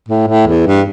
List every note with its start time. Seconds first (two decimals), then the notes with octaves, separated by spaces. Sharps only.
0.08 A2
0.28 A2
0.47 E2
0.67 G2